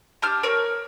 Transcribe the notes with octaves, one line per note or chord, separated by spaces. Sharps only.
D4 G4 F6
A#4 C#5